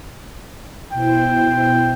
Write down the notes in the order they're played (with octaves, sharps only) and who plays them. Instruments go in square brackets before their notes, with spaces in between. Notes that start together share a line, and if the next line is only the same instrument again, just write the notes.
[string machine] B2 E4 C5 [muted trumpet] G5